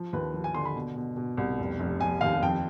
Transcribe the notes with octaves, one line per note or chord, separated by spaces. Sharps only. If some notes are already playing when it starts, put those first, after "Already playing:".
Already playing: F3
D#2 B4
F3
G#5
D3 C6
B5
B2
B2
B2
C2
F1
F1
F1 G#5
D#2 F5
F2 G5